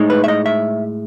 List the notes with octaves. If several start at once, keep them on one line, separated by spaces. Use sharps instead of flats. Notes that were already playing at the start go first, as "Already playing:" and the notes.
Already playing: A2 G#3 D#4
B4
E5
D#5
E5